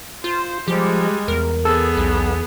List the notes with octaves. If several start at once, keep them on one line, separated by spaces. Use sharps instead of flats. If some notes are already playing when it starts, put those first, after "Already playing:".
F4 C5
F3 G3 G#3 G4
E2 A#4
B3 G#4 A4
B1